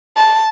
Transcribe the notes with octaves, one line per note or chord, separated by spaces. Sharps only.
A5